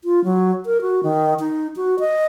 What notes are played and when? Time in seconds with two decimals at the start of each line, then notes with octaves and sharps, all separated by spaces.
0.04 F4
0.24 F#3
0.66 A#4
0.81 F#4
1.03 D#3
1.40 D#4
1.76 F#4
1.99 D#5